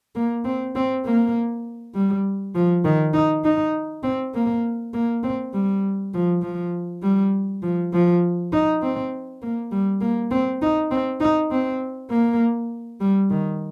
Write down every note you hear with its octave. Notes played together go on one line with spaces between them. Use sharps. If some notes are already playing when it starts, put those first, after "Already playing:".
A#3
C4
C4
A#3
G3
F3
D#3
D#4
D#4
C4
A#3
A#3
C4
G3
F3
F3
G3
F3
F3
D#4
C4
A#3
G3
A#3
C4
D#4
C4
D#4
C4
A#3
G3
D#3